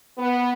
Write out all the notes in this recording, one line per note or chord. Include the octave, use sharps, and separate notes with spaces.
B3